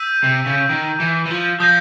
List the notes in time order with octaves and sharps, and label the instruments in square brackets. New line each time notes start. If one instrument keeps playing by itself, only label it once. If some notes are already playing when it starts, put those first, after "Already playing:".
Already playing: [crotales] E6 G6 B6 D#7
[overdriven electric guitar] C3
C#3
D#3
E3
E3
F3
[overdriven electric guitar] F3 [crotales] D#6 G6 A#6